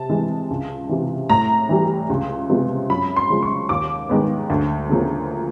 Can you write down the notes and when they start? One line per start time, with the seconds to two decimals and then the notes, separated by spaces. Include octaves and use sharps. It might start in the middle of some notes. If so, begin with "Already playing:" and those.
Already playing: C3 A5
0.09 E3 G#3
0.50 C#2
0.89 C3 E3
1.29 A2 A#5
1.69 E3 G3
2.10 C#2
2.49 C3 F3 G#3 B3
2.89 F#2 B5
3.16 C6
3.29 C#3 F3 G#3
3.43 C#6
3.69 D#2 D6
4.09 D#3 G#3 B3
4.50 D2
4.89 C#3 F3 A#3